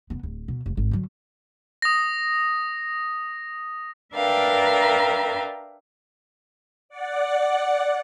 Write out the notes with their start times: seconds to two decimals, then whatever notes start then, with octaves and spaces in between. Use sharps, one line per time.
0.10 F1 B3
0.23 D1
0.48 B2
0.66 F1
0.77 G#1
0.91 D3 F#3
1.82 D#6 A#6
4.15 D4 A#4 B4 E5 F5 G5
6.89 D5 F#5